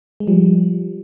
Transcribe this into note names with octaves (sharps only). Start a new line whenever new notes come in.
G#3
F3 G3